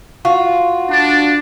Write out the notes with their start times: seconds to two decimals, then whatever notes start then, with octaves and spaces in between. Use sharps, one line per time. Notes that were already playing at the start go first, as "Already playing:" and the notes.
0.25 F4 F#4
0.91 D4